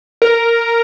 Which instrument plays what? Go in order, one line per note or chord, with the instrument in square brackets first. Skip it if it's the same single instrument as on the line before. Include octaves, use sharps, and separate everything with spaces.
[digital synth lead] A#4